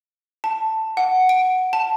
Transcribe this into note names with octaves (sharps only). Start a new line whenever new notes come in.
A5
F#5
D7
A5